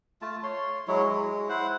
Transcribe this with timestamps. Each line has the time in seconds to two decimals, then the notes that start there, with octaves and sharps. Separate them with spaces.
0.22 A3 F4 A5
0.43 C#5 C6
0.88 F#3 G#3 E4 C#5
1.02 G#3
1.49 E4 C5 F#5